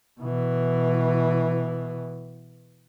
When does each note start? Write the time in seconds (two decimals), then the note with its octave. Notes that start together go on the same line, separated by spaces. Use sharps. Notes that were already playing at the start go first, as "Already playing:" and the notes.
0.20 B2 E3